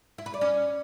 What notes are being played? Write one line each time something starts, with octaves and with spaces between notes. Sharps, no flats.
E4
B4
D5
C#4